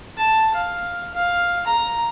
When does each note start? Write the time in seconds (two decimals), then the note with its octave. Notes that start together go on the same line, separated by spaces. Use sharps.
0.18 A5
0.54 F5
1.14 F5
1.67 A#5